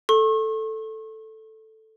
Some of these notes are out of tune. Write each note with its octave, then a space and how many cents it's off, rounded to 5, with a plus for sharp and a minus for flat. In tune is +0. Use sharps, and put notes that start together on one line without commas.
A4 +0 C#6 -40